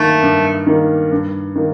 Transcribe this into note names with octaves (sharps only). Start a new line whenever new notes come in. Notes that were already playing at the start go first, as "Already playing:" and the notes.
Already playing: G2 D#3 A3 A#3
G2
D#3 A#3
G2
D#3 A#3